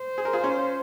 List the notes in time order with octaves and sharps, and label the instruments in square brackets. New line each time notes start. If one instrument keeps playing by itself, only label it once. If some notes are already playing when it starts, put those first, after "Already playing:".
Already playing: [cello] C5
[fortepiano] G#4
A#4
F4 G#4
C#4 F4